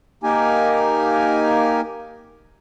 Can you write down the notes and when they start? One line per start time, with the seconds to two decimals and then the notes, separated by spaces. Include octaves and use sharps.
0.23 A#3 D#4 G4 A#4 G#5